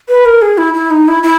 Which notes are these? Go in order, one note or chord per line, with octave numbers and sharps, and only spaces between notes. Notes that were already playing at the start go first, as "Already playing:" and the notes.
B4
A#4
G#4
E4
E4
D#4
E4
E4